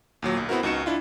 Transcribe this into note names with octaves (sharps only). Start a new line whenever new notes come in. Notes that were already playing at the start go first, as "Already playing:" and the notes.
D#2 A#2 F#3
B1
B3 C4 E4 F#4 A#4
C#2 D#4 F#4 C#7 E7
D4 E4 F4